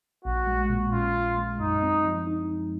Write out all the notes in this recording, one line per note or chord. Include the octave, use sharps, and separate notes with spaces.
A#1 F#4
G#3
A#2
C#4 F4
A#1
G#3
F#2 D#4
C4
F3
D#4